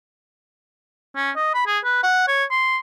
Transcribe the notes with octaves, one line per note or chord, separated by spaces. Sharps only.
C#4
D#5
B5
G#4
B4
F#5
C#5
C6